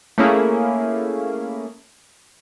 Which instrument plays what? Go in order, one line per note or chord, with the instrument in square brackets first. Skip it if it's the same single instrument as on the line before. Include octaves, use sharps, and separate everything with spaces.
[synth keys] A3 A#3 C#4 E4 G#4